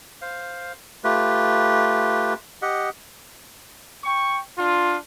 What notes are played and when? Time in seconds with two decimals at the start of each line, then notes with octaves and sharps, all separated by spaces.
0.22 C5 F5
1.04 A3 F4 G4 B4
2.62 G4 D#5 F#5
4.04 G5 C#6
4.58 D4 F4